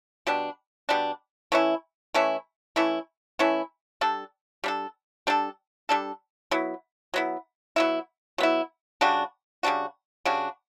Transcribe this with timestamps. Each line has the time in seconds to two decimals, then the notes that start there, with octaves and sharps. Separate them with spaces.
0.27 B2 G3 D4
0.89 B2 G3 D4
1.52 E3 A3 C#4 E4
2.14 E3 A3 C#4 E4
2.76 E3 A3 C#4 E4
3.39 E3 A3 C#4 E4
4.01 G3 D4 A4
4.64 G3 D4 A4
5.27 G3 D4 A4
5.89 G3 D4 A4
6.51 F#3 B3 E4
7.14 F#3 B3 E4
7.76 F#3 B3 E4
8.38 F#3 B3 E4
9.01 C#3 G3 D4 F#4
9.63 C#3 G3 D4 F#4
10.25 C#3 G3 D4 F#4